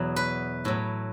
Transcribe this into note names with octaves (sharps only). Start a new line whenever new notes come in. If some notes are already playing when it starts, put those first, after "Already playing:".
Already playing: E2 B2 F#3
B4
A2 F#3